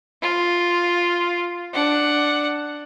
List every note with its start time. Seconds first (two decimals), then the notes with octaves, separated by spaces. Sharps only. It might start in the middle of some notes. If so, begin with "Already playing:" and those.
0.22 F4
1.73 D4 F#5